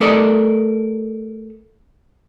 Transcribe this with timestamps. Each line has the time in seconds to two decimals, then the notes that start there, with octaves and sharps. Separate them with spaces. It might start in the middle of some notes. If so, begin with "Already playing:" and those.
0.01 A3 G4 A4 A#4 D5 D#5